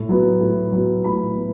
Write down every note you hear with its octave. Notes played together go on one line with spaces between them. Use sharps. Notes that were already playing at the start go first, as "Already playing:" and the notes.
Already playing: A2
F#3 B3
A2
F#3 B3
A2 B5
B3